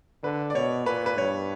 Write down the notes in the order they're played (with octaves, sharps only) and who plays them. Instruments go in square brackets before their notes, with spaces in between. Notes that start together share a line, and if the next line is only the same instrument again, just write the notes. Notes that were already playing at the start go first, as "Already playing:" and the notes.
[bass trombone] D3 [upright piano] B4
[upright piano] D5
[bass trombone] B2 [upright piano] C#5
[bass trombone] A#2 [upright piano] B4
[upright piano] B4
[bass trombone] G2 [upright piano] C#5